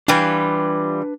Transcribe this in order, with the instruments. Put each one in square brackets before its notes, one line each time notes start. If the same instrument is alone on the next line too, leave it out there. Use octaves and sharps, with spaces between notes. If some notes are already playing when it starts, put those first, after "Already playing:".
[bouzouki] E3 G3 F4 [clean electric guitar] D4 B4 B5